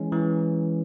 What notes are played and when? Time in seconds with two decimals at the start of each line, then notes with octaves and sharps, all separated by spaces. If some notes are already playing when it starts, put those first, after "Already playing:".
Already playing: E3 G#3 C#4
0.12 E3